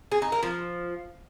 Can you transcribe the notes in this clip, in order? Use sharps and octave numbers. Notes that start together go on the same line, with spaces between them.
G#4
D#4
A#4
F3